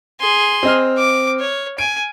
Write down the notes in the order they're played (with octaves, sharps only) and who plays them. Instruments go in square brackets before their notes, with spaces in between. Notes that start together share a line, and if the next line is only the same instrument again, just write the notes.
[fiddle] G#4 C6
[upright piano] C4 D#5 F6
[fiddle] D6
C#5
[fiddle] G#5 [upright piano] D7